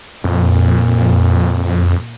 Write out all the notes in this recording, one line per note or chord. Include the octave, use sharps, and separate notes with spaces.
F2 A#2